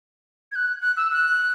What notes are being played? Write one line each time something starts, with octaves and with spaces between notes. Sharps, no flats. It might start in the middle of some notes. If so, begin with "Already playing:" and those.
G#6
F#6
F#6
E6
F#6